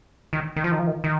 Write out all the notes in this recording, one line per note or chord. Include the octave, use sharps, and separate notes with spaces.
D#3
D#3
F3
D#3
F3
D#3
D#3